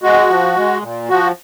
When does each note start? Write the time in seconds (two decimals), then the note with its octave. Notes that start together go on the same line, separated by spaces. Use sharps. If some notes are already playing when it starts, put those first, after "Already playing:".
0.03 G#3 F#4
0.29 F3
0.56 G#3
0.82 A#2
1.09 F3 F#4